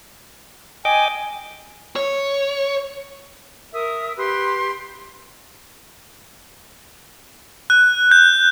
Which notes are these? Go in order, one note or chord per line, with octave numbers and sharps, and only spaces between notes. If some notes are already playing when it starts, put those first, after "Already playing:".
D#5 G5 G#5 D6
C#5
A#4 E5 D#6
G4 B4 C6
F#6
G6